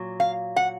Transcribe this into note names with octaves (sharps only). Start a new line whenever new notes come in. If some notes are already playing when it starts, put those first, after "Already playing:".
Already playing: A#2 F#3
F5
F#5